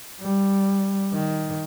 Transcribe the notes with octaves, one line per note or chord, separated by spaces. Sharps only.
G3
D#3